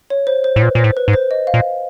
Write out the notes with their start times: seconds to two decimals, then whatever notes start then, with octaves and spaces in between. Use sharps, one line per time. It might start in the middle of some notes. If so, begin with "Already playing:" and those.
0.10 C#5
0.27 C5
0.44 C5
0.56 A2
0.62 A#2 B4
0.75 A#2 C5
0.84 A2
0.97 B4
1.08 G#2
1.14 C5
1.31 D#5
1.47 F5
1.54 A#2